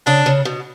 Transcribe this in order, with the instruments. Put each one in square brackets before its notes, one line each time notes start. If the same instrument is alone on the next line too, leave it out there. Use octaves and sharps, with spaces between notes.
[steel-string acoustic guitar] C#3 [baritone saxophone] D4
[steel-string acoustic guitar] C#3
B2